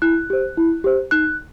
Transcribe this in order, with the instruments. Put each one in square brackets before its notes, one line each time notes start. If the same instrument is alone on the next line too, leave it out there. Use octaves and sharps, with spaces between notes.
[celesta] E4 F#6
G4 C5
E4
G4 C5
D#4 F#6